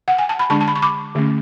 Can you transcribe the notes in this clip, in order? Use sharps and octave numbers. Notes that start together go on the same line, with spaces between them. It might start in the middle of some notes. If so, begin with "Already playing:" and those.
F#5
G#5
A5
B5
D3 G#3 D4 A5 C#6
A5
B5
C#6
B5 D6
D3 A3 C#4